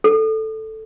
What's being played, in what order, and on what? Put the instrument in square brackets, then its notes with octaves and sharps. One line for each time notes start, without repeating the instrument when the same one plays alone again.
[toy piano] A4